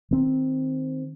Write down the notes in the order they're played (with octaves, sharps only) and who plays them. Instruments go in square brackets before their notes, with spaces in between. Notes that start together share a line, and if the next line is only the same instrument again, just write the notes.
[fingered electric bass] D#3 C4